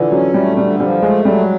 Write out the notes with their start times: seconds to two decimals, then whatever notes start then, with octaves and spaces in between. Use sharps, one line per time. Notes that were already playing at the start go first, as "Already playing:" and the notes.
Already playing: D3 E3 F3
0.11 F#3 C#4
0.34 G3 A3
0.57 D3 G3
0.79 F3 G3
1.02 G#3 A3
1.25 F#3 G3